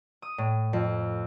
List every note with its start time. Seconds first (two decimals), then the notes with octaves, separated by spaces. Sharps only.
0.22 D#6
0.38 A2
0.73 F2